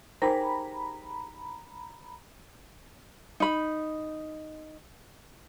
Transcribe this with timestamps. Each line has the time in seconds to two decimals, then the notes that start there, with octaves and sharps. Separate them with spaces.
0.22 D#4 G4 G#4 A#4 C5 A#5 B5
3.40 D#4 B5